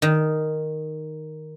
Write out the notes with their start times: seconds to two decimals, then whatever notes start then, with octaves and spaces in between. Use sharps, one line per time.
0.02 D#3